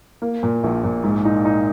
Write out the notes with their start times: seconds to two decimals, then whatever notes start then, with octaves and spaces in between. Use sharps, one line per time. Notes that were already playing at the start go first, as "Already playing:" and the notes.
0.22 A#3
0.43 A#2
0.64 A#1
0.84 A#2
1.04 G#2
1.25 D#4
1.45 D#4